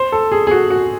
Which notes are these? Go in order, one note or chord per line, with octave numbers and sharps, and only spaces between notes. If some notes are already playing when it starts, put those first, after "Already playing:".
Already playing: C5
A4
G#4
G#4
F#4
F#4